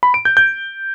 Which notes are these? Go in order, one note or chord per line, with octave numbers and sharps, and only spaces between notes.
B5
D7
G6
G6